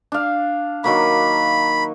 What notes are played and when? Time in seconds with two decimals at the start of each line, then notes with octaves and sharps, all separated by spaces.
0.12 D4 F5
0.84 D#3 F#3 A#3 B5